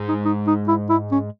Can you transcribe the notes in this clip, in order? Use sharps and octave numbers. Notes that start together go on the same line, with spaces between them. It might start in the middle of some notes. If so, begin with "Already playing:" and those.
Already playing: G#2 G#3
D#4
D#4
D#4
E4
E4
C#4